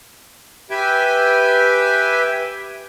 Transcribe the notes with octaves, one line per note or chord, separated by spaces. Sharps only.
G4 B4 E5 G5 G#5